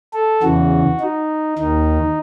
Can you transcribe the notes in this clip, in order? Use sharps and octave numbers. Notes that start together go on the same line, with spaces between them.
A4
E2 C#3 E3 F#4
D#4
D#2 D#3 D#4